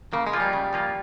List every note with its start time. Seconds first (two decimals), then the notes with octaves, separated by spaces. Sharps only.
0.13 C#3 A#3
0.27 G#3
0.33 F3 A#3 F4
0.40 G3
0.53 C#3
0.73 F3 A#3 F4